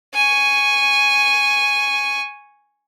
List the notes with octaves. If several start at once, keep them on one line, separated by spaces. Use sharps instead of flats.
G#5 C#6